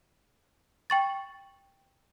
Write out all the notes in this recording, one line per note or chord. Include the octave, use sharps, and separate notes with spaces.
G5 C#6 A6